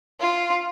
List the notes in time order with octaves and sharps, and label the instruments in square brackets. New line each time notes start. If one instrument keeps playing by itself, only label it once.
[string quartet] F4